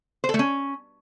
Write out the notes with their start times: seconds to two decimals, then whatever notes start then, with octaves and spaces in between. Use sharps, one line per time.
0.24 C5
0.29 A4
0.34 A3
0.39 C#4